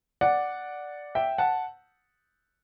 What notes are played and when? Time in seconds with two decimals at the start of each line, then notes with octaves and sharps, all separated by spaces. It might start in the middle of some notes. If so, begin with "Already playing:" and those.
0.21 D5 F#5
1.15 E5 G5
1.38 F#5 A5